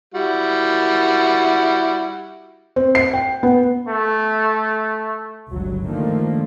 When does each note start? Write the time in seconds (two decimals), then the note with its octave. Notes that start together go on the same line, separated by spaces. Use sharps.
0.14 G3 E4 F#4
2.76 C4
2.95 C7
3.13 G5
3.43 B3
3.89 A3
5.50 G1 C#2 F#3
5.85 D3 D#3 F3 A3 A#3